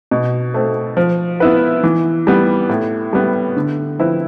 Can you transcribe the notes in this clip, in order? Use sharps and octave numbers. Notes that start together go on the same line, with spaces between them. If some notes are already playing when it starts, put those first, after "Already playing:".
B2
A3 C4
F3
B3 E4 B4
E3
G3 B3
A2
G3 B3
D3
F3 C4 E4 B4